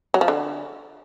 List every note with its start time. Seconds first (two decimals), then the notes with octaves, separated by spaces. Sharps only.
0.14 F#3
0.21 F3
0.28 D3